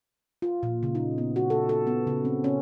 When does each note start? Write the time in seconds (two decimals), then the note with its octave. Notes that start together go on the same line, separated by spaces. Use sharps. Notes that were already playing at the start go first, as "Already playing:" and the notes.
0.42 F4
0.63 A#2
0.83 C#3
0.95 D#4
1.18 B3
1.36 F#4
1.50 A4
1.69 A4
1.87 B3
2.07 C#3
2.25 C4
2.44 C#4